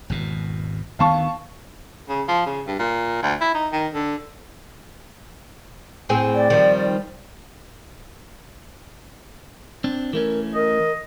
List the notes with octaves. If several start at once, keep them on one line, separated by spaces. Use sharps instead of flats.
G#1 E2 B2
D2 D#3 B3 F5 A5 C#6
C#3
F3
C#3
G2
A#2
D2
E4
D#4
D#3
D3
A2 C4 G#4
D5
D#3 F3 G3
C4 D4
E3 A3 C#4 A#4
A#4 D#5